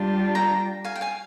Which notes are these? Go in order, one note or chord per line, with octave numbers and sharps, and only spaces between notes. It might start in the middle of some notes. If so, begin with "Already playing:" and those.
Already playing: G3 D4 F4
G5 A#5
F5 G#5
G5
F5 G#5